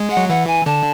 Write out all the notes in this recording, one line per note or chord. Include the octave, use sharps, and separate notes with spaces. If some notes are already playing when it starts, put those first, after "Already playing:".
Already playing: G#3
F#5
F#3
E3 F#5
G#5
D3 A5